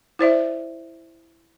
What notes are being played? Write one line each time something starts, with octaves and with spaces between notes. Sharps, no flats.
E4 C5 D5 E5